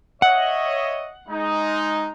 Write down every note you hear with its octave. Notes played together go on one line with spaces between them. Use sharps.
C#5 D#5 E5 F#5
G#3 D#4